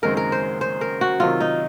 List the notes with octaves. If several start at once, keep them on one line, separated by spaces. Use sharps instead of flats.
F#1 F#2 D#3 G#3 C4 A#4
A#4
C5
C5
A#4
F#4
C3 D#3 F#3 F4
D#4